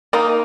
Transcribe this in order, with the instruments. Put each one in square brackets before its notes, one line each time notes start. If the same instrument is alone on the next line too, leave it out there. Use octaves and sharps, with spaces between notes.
[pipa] A#3 D#4